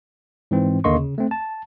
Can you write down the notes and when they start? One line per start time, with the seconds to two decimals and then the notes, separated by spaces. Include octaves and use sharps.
0.51 G#2 E3 C4
0.84 D#2 D3 A#3 D#5 C6 C#6
0.97 C#3
1.18 A3 C4
1.31 A5